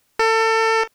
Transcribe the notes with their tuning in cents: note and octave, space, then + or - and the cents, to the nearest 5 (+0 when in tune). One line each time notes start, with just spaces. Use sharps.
A4 +30